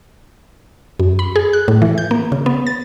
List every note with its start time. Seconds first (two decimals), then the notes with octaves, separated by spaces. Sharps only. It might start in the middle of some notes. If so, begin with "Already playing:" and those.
1.00 F#2
1.19 B5
1.36 G#4
1.53 F#6
1.68 A2
1.82 E3
1.98 G6
2.11 A#3
2.32 C#3
2.46 B3
2.67 A6